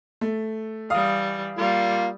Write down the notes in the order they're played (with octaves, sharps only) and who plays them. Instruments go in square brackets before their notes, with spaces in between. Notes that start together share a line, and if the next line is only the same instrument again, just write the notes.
[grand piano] A3
[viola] E3 G3 [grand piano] F5 D#6
[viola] G3 [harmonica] A#3 F4